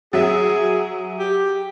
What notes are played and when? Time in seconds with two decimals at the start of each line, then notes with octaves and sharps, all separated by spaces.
0.13 F#3 G#4 E5
1.19 G4